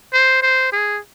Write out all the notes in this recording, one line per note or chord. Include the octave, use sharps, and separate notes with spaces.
C5
C5
G#4